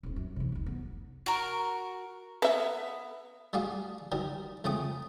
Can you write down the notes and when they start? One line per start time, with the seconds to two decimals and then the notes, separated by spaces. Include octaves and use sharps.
0.03 D#1 C4
0.16 F#2
0.36 C3 E3
0.52 E1 D#3
0.66 B3
1.26 F#4 A#4
2.42 B3 B4 E5
3.53 G3 D4 F#4 G#4 F5
4.12 D#3 F#3 G3
4.64 F2 C#3 A3 C#4 G5 D#6